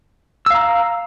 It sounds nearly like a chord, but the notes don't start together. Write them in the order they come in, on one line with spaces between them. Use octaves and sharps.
E6 F5 A#5